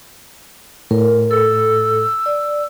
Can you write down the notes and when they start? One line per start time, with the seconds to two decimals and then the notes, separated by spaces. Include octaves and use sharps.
0.91 A2 A#4
1.31 A4 E6
2.26 D5